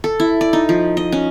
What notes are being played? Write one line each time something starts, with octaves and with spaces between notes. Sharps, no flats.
A4
E4
D5
D#4
F3
D#5
C#4